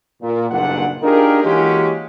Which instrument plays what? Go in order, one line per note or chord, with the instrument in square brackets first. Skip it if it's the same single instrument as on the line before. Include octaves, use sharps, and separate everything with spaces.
[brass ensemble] A#2
F#1 B1 G2 A#2 D4 F#5
D4 D#4 F4 G4 G#4 A#4
E3 G#3 A#3 C#4 F#4 G4